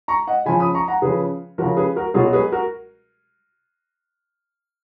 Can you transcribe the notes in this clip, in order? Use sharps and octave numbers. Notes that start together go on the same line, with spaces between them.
A#5 C#6
D#5 F#5
C#3 F3 G#5 B5
B5 D#6
A#5 C#6
F#5 A#5
C#3 F3 G#4 B4
C#3 F3 F#4 A#4
G#4 B4
F#4 A#4
B2 F#3 F4 G#4
G#4 B4
F#4 A#4